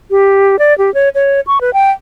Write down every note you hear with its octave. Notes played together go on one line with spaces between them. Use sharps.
G4
D5
G4
C#5
C#5
C#6
B4
G5